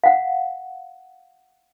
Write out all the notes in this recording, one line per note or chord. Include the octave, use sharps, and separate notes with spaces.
F5 F#5